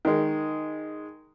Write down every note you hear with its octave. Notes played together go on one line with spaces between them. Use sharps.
D#3 G#3